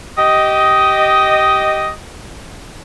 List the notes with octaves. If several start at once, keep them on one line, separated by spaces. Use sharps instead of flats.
G4 D#5